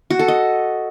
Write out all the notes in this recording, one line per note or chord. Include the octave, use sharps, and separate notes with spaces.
F#4
A4
D#5